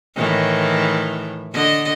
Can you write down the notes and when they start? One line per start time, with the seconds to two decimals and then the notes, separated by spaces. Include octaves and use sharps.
0.15 A2 D#3 E3
1.53 D3 D#5